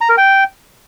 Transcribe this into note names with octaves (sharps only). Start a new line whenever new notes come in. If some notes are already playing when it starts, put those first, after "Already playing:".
A#5
A#4
G5